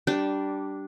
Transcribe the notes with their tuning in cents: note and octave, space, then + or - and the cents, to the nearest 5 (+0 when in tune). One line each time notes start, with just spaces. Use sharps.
G3 -15 D4 +0